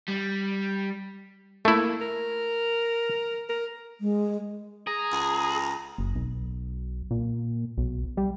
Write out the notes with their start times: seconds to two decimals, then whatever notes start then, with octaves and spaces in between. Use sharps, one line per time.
0.08 G3
1.65 A3 A#3 E4
2.01 A#4
3.50 A#4
4.01 G#3
4.87 G#4 A#5
5.12 C#2
5.98 F#1
6.15 B1
7.11 A#2
7.78 B1
8.17 G3